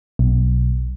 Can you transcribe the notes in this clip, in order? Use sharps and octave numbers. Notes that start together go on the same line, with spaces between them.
B1